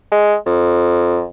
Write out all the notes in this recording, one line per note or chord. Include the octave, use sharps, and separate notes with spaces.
G#3
F2